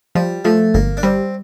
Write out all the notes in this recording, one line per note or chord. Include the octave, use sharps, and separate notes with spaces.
F3 G3
F3 A3
G1 A#3
D4
G3 C4